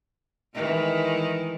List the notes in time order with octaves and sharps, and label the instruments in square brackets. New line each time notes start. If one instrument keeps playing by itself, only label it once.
[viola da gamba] D#3 E3 G#3